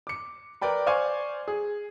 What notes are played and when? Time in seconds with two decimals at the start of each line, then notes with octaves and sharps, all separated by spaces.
0.07 D6 C#7
0.62 A#4 B4 D5 G5 B5
0.86 C5 D5 F5 G#5 C#6
1.48 G#4